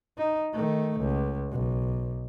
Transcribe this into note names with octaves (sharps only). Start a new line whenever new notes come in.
D#4
D#3 A3
C#2
B1